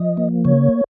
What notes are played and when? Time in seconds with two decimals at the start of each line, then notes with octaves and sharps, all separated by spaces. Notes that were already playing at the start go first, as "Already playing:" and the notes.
Already playing: F3 D#5
0.17 A#3
0.45 C#3 C#5